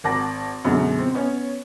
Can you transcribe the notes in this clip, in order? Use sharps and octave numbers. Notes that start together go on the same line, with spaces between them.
G#1 A#4 F#5 A5 D6 A#6
F#2 B2 D3 F#3 G#3
C4
B3 C#4 C#5